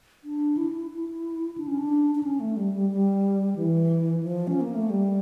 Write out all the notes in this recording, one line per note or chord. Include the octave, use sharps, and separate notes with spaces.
D4
E4
E4
D4
C#4
D4
D4
C#4
A3
G3
G3
G3
E3
F3
C#4
A#3
A3
G3